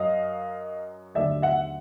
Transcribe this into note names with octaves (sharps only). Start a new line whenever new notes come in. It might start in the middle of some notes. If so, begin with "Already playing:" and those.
Already playing: F#2 F#3 D#5 F5
D#2 D3 F#3 A3 D5 E5
E5 F#5